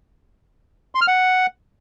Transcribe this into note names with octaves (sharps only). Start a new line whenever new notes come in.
C6
F6
F#5